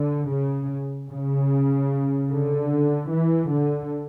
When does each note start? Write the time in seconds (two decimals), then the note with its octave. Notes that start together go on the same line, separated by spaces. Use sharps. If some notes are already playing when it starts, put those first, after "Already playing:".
Already playing: D3
0.29 C#3
1.10 C#3
2.30 D3
3.11 E3
3.51 D3